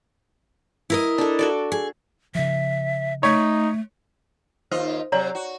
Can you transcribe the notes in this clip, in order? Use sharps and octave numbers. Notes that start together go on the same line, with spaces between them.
E4 A#4 D#5
D4 A4
F#4 A4 D5
G#4
C#3 F3 E5
A3 D#4 C#5
D#2 F4 C5 D#5
C3 F#3 C#5 D5 A#5
F#4